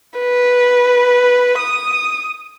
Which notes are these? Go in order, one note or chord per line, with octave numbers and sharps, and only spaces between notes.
B4
D#6